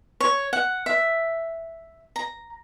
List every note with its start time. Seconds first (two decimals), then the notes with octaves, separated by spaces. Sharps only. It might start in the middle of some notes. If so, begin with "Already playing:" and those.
0.20 C#5
0.53 F#5
0.86 E5
2.16 A#5